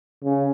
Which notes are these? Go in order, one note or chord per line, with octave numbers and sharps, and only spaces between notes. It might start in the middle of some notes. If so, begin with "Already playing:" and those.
C#3